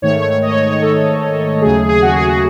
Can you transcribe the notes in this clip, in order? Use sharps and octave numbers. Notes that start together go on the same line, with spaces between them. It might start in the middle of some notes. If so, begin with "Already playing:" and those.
G#2 D#3 A3 C#5
C#5
D#5
C#5
C#5
C#5
A4
D#2 C#3 F#3 A3 G#4
G#4
F#4
G#4
F#4